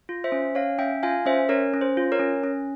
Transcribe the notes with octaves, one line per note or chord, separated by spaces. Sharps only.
F4
C5 E5
C#4
C#4 C#5 F5
C#4 E5 G5
F4 F5 G#5
C#4 C5 E5
C#4 A#4 C#5
C#4
C5
F4
A#4 C#5
C#4
C#4